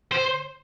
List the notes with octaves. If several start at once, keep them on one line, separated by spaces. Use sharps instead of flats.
C5